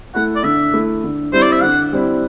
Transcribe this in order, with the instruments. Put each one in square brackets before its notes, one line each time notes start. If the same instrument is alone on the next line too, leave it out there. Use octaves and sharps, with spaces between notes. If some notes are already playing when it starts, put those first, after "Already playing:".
[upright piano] A3 E4 [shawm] F#5
[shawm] D5
[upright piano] D3 [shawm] E5
[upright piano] A3 E4
D3
[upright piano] G3 C4 E4 [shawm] C5
[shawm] D5
E5
[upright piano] D3 [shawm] F#5
[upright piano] G3 C4 E4